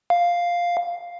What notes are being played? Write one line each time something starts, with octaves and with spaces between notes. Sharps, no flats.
F5